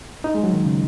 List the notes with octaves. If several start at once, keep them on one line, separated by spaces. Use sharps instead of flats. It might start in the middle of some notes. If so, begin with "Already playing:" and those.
D#4
G#3
F#3
D#3
C#3